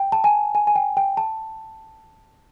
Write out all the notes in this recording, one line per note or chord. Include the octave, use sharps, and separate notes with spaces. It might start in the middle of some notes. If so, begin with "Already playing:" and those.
Already playing: G5
A5
G#5
G#5
G#5
G5
G5
A5